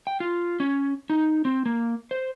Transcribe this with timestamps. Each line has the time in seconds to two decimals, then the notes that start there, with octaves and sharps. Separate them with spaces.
0.07 G5
0.20 F4
0.60 C#4
1.10 D#4
1.45 C4
1.66 A#3
2.11 C5